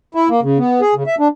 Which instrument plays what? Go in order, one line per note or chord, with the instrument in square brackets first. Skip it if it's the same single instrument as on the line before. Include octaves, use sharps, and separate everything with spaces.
[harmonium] E4
A#3
C#3
B3
G#4
C#3
E5
D4